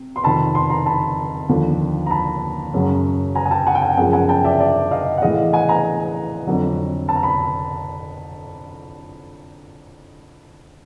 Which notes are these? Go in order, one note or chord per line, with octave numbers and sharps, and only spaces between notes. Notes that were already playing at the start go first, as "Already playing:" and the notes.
Already playing: C3
C6
F2 C3 D#3 A5 B5
C6
A#5 C6
A5 B5
D#2 D3 F3
A#5
A5 B5
F#2 C#3 F#3
G#5 A#5
G#5
G5 A5
F#5 G#5
G5
F#5 G#5
F#2 C#3 F3 G#3 F#5 G#5
F#5 G#5
G5 A5
D5 E5
D5 E5
D#5 F5
F#5
A2 E3 G#3 D#5 F5
F#5 G#5
G#5 A#5
F2 D3 F#3
A5
A#5
B5